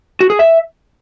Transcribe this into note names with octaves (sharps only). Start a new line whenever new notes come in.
F#4
G#4
E5